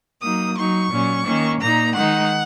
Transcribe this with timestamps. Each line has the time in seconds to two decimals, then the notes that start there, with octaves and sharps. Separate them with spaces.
0.21 F#3 A#3 D#4 D#6
0.56 F#3 D#4 C#6
0.90 A#2 F#3 C#4
1.25 D#3 A#3 C#4
1.60 A#2 A#3 D#4 A#5
1.95 D#3 G#3 D#4 F#5